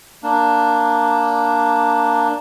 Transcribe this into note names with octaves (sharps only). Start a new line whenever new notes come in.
A#3 D4